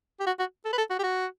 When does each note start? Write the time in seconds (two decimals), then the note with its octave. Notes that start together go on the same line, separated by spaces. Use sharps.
0.20 G4
0.26 F#4
0.39 F#4
0.65 A4
0.73 B4
0.78 A4
0.90 F#4
0.99 G4
1.03 F#4